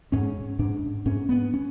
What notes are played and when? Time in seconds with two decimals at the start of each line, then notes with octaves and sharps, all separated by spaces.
0.12 G#2 C#4
0.59 G#2 D4
1.06 G#2 C#4
1.29 B3
1.54 C#4